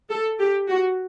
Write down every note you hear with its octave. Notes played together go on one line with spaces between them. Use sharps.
A4
G4
F#4